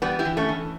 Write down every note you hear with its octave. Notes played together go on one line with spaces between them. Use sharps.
E3 G3 B3
E4 G4
E3
A3 C#4
E3